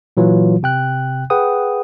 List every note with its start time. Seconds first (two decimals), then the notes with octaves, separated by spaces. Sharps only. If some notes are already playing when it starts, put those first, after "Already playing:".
0.17 A#2 E3 F#3 F4
0.63 C3 G5 F#6
1.30 G#4 B4 F#5 G5 D#6